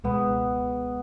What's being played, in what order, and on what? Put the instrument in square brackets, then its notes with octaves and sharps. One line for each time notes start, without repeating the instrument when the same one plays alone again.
[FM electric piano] C#2 B2 G#3 [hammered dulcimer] B3